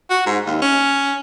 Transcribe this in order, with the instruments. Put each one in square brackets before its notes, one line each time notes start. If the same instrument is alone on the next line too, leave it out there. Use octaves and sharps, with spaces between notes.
[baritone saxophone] F#4
G#2
D#2
C#4